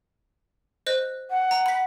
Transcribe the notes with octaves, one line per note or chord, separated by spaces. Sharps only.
C5 D#5 F#6
F#5
A#5
B5 B6